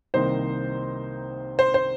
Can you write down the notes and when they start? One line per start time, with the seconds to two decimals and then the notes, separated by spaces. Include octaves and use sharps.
0.14 C2 C3 D#3 A#3 D#4 C5
1.59 C5
1.74 C5